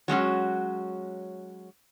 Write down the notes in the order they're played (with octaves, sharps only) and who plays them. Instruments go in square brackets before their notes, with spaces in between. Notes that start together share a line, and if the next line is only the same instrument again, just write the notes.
[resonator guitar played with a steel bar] F#3 G#3 C#4 F#4